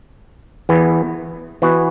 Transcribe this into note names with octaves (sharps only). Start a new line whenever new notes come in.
E2 E3 B3
E3 B3 F#4